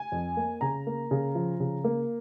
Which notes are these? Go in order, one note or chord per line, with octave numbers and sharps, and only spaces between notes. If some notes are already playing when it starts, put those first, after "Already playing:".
Already playing: G#5
F2
A#3
C#3 A#5
A#3
C#3
F3
C#3
A#3